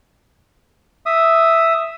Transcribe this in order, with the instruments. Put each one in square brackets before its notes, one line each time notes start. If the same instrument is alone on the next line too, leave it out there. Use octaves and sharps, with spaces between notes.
[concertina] E5 D#6